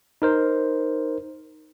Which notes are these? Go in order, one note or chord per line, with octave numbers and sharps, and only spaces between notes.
D#4 A#4 C5